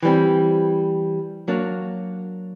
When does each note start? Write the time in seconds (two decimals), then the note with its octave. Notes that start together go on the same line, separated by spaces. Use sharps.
0.03 E3 G3 C4
1.48 F#3 A#3 D4